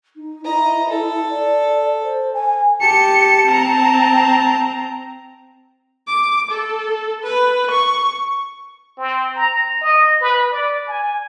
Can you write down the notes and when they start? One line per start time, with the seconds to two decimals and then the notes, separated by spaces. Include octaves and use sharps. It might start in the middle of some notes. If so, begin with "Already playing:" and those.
0.16 D#4
0.45 E4 D#5 A#5
0.89 A4
1.29 D5
2.03 C5
2.33 G#5
2.81 G4 A5 C#7
3.47 C4 A#5
6.07 D6
6.51 A4
7.23 B4
7.71 C#6
8.97 C4
9.36 A#5
9.81 D#5
10.21 B4
10.52 D5
10.87 G#5